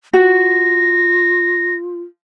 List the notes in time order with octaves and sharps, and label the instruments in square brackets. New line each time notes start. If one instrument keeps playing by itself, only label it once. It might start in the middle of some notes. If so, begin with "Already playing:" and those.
[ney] F4 [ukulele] F#4 [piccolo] A#6